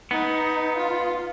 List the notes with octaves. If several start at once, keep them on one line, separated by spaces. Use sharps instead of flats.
B3 D#4
F4